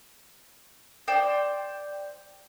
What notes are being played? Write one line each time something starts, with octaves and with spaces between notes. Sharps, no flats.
C5 D5 G5